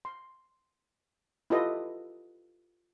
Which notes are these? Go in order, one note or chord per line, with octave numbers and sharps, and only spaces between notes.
C6
E4 F4 G4 A4 B4 D#5